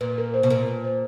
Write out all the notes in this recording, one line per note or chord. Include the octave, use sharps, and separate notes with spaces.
A#2 B4
A#4
C5
B2
A#2 A#4
B4
C5